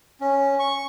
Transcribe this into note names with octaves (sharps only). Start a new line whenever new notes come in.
C#4
C#6